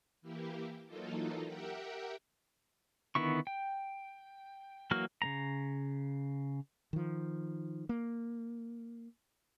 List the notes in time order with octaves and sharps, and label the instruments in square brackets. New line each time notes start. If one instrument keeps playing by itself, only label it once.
[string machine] E3 A#3 E4 G4
E3 F#3 A#3 D#4 F4 A4
G4 A#4 E5 F#5 G5
[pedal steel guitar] D3 D#3 B3 E4 C#6
G5
E3 F#3 A#3 F#4 F6
C#3 A#3 A#5
[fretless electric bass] D#3 F3
A#3